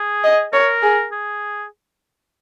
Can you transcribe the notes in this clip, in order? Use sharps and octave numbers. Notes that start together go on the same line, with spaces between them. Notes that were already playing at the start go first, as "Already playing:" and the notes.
Already playing: G#4
D#5
A#4 C#5
G#4
G#4